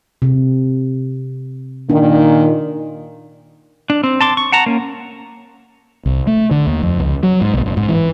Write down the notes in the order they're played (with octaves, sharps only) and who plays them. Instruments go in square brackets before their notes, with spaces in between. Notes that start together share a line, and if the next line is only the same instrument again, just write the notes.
[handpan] C3
[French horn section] A#2 D#3 [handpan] D4
[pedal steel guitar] D4
C4
A5 C6 D6
C#6
F#5 A5 A#5
A#3 C#4
[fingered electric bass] C2
A3
D3
D#2
F2
C#2
F#3
G#2
B1
F#1
G#2
E3